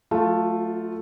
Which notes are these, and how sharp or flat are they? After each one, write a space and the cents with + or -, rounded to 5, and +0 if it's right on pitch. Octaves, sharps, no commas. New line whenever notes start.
F#3 -35 A3 +0 F4 +0